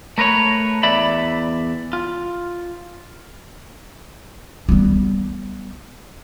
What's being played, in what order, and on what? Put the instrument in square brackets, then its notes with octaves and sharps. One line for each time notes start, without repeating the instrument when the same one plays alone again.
[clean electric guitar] A3 A#4 B4 C#5
E2 D5 E5 B5
F4
[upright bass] G3 B3